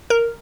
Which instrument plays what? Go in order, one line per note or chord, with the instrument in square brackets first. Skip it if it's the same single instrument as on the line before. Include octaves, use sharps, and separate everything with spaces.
[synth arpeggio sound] A#4